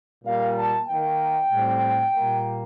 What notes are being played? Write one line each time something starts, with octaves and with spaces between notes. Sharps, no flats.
A#2 G3 A#3 F5
A5
D#3 A#3 G5
A2 G3 C4
A#2 G3 A#3